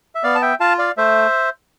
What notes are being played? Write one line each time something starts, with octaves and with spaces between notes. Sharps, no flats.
E5
B3 D5 F5
A5
E5 G5
F4 F5 A5
D5 F5
A3 C5 E5